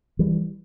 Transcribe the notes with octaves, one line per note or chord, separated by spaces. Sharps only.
E3 G3